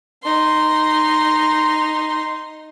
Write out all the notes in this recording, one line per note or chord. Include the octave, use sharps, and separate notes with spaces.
D#4 C6